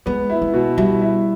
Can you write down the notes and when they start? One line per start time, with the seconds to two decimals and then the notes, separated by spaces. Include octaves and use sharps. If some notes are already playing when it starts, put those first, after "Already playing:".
0.06 G#3 B3
0.30 E4
0.42 G#3
0.54 B2
0.77 G3 E4
1.01 E4